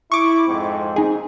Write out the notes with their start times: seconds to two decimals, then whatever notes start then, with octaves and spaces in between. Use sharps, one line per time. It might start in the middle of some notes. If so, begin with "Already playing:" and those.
0.12 E4 C#6 D6
0.47 F2 G#2 C4
0.96 D#4 G#4